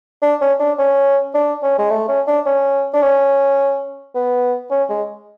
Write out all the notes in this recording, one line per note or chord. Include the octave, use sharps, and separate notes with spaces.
D4
C#4
D4
C#4
D4
C#4
G#3
A3
C#4
D4
C#4
D4
C#4
B3
C#4
G#3